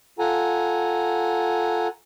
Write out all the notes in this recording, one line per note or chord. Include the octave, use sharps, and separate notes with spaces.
F4 A4 F#5 G#5 A#5